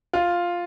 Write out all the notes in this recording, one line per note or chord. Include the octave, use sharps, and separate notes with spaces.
F4